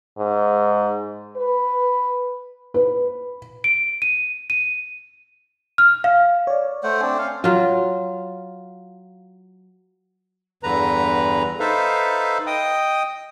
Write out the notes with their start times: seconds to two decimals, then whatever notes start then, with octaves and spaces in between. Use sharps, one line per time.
0.18 G#2
1.36 B4
2.74 B4
3.64 D7
4.02 D#7
4.50 D#7
5.78 F6
6.04 F5
6.47 C#5 D5
6.84 A3 C5 F#5
7.01 C4 D4 G#5
7.18 C#4 F5
7.44 F#3 F4
10.63 E2 G2 D3 B4 A#5
11.60 D#4 A4 B4 C5 E5 F5
12.47 D#5 G5 D#6